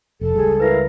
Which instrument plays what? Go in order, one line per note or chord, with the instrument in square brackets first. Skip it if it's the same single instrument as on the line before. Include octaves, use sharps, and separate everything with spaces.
[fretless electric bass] F1 [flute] A4
[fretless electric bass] C#2 G3 [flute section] G#4
[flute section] E4 A#4 F5 [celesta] B4 A#6